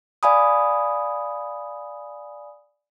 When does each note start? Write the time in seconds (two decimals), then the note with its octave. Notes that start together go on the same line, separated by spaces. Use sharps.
0.23 D5 F5 G#5 B5 D#6